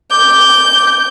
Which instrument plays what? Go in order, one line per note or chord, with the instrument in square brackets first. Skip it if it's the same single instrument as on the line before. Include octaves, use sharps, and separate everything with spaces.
[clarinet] D6 [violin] G6